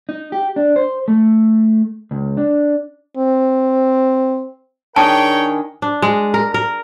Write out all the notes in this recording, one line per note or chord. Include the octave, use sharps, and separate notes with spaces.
D#4
G4
D4
C5
A3
C#2
D4
C4
D#3 D4 G#4 A#4 C#5 G5 A5
D4
G#3
A#4
A#4